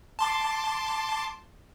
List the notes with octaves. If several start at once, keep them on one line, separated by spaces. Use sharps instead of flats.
A5 C6 D6